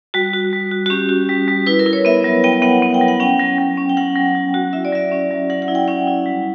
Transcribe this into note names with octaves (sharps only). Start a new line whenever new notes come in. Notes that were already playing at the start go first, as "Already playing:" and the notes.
G3 F#4
F#4
G3
F#4
F#4
C#4 G4
F#4
G3
G3
E4 B4
A#4
E4
C#5
B3 E5
F#3
B3 G5
B3 F#5
B3
G5
F#3
F#5
C#4 G5
F#3
F#3
C#4
G5
F#3 F#5
F#3
F#3
F#4
E4 E5
D5
F#3 E5
C#4
F#3
F#3 F#5
F#5
E4
G5
C#4 F#5
E4
G3